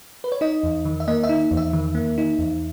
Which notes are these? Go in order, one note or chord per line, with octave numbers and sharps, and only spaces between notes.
B4
C#5
D#4 D#5
E2
D#3
E5
A#3 D#5
E5
D#4
E2
E5
D#3
A#3
D#4
E2